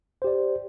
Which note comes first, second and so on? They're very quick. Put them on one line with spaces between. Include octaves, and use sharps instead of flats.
C5 G4 D5